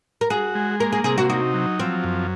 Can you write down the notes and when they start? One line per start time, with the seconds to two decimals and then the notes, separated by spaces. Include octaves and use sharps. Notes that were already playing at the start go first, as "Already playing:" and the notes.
0.21 A#4
0.30 F#4 G#4
0.55 G#3
0.80 A#3 A#4
0.92 G#4
1.04 C3 G#4
1.18 F#4
1.29 D#4 F#4
1.54 F#3
1.79 F3 C4
2.04 F#2